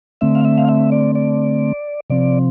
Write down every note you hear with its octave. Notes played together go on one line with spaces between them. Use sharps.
D3 A3 C4 E5
F5
E5
F5
E5
D5
D5
C3 F3 C4 D5